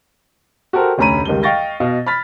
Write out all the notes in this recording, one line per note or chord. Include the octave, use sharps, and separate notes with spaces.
F#4 G4 A4 A#4 C5
F1 D2 C#4 A#5 B5 D#7
C#2 D#3 G3 G7
D#5 F5 G5 C#6 A6 A#6
B2 D#5 F5
B5 F6 A6 B6